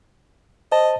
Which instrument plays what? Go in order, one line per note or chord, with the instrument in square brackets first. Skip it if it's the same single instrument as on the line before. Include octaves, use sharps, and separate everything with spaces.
[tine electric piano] C5 A5 [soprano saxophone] D#5